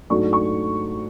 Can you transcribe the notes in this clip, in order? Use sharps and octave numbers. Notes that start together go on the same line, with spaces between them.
G#2 F#3 A3 D4 C#6
C#6